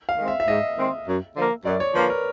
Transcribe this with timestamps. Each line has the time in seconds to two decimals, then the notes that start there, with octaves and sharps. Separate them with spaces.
0.09 F5
0.18 D#3 G#3 C4
0.28 E5
0.40 E5
0.47 G#2 D#5
0.78 D#3 G#3 C4
1.07 F#2
1.37 D3 F3 A#3
1.65 F#2 D5
1.80 C#5
1.95 D3 F3 A#3 B4
2.10 A#4